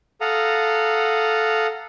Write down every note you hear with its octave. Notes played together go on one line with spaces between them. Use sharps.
A4 F5 F#5 A#5 D#6